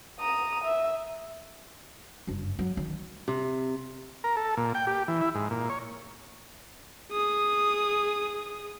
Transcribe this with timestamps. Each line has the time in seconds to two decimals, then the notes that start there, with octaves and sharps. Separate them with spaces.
0.20 A#5 D#6
0.64 E5
2.27 F#1 G2
2.59 F#3
2.77 D#3
3.28 C3
4.24 A#4
4.37 A4
4.57 A#2
4.75 G5
4.87 G4
5.08 E3
5.21 E4
5.35 G#2
5.51 A#2
5.70 C#5
7.12 G#4 D#6